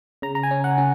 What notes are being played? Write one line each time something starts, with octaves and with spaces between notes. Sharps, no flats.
C#3 A#5
A#5
G#5
C#4
F#5
C#4